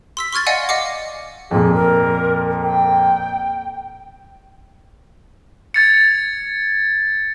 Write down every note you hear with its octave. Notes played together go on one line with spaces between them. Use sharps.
C6 E6 B6
C6 C#6 F6 G#6 A6
D5 D#5 F5 F#5 G#5
D#5 F5 F#5 D6
F2 A#2 G#4
A#4
G5
G#6 A6 C#7